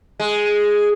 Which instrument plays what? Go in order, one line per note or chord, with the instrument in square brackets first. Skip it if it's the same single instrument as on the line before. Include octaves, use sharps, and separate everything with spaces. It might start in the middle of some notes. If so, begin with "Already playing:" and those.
[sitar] G#3